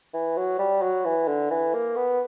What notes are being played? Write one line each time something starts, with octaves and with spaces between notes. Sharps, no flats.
E3
F#3
G3
F#3
E3
D3
E3
A#3
B3